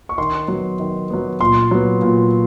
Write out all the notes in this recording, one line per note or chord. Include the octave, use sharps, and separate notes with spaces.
C#6
D#3 C6
F#3 B3
D#3
F#3 B3
A#2 C6
F#3 B3
A#2